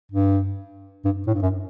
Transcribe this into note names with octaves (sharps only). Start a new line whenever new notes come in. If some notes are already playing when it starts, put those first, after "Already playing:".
G2
G2
A2
G2
F#2